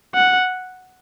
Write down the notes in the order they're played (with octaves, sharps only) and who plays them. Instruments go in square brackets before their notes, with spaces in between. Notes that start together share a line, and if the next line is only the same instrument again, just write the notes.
[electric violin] F#5